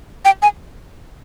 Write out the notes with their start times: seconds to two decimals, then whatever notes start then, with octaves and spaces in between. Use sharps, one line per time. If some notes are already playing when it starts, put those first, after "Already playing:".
0.25 G5
0.42 G#5